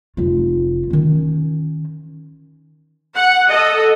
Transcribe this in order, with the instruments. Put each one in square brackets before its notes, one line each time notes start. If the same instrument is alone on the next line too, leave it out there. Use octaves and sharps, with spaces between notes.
[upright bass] F1 F4
D#3 C#4
[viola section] F#5
A4 D#5